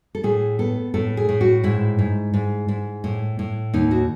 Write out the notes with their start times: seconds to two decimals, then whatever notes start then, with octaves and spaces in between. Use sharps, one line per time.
0.15 A4
0.23 A2 G#4
0.59 B3 A4
0.94 A2 A4
1.17 G#4
1.29 A2
1.41 F#4
1.64 G#2 E4
1.99 G#2
2.34 G#2
2.68 G#2
3.04 A2
3.39 A2
3.74 D#2 D#4
3.91 F#4